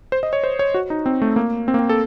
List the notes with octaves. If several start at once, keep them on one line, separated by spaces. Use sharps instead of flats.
C5
D#5
C#5
C5
C#5
F#4
D#4
C4
A3
A#3
C4
A#3
C4
A4